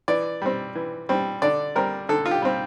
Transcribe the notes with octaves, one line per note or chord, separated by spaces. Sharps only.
E3 D5
G3 C4
E3
G3 C4
D3 D5
G3 C4 A#4
D3 A4
F4
G4
G3 C4